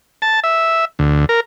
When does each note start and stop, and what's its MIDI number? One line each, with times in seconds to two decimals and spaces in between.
0.22 0.40 81
0.44 0.85 76
0.99 1.25 38
1.29 1.40 70